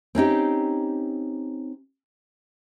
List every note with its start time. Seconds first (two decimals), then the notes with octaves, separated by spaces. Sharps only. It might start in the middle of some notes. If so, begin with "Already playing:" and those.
0.15 C4 C#4 D#4 G4